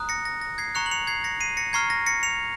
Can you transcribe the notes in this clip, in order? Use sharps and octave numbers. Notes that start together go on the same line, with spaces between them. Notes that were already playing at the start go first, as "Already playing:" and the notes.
Already playing: A#5 D#6 F#6
A#6 C#7
A#6
A#6
G#6 C7
A#5 C#6 F#6 C#7 F7
F#7
C#7 F7
G#6 C7
A#6 C#7
C7 D#7
A#6 C#7
A#5 C#6 F6 G#6 C7
A#6
A#6 C#7
C#7 F7